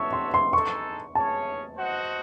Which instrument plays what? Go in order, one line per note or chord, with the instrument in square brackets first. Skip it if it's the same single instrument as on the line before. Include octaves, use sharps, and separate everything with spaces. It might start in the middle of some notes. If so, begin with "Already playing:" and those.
Already playing: [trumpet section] F#4 A4 C#5 E5 [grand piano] C#6
[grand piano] C6
C6
[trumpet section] G#3 D#4 A4 [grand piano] C#6
[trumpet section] C#4 G#4 C#5 [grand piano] A5
[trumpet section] F#4 C5 D#5 F#5